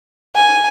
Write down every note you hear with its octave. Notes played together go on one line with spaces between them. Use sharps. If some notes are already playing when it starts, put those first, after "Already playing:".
G#5